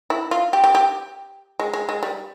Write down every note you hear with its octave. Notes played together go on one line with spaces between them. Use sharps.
E4
F4
G4
G4
G4
G#3
G#3
G#3
G3